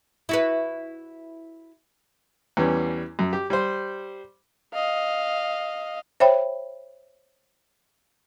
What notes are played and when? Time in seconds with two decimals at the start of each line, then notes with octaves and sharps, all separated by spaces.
0.29 E4 F#4 B4
2.57 E2 G3 B3 C#4
3.19 F#2
3.33 G4
3.50 G3 C5
4.74 D#5 F5
6.20 C5 C#5 E5 G5 B5